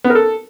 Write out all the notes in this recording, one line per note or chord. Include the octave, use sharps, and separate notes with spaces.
B3
A#4
A4